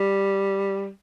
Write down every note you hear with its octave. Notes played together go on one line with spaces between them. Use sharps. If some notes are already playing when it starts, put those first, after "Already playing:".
Already playing: G3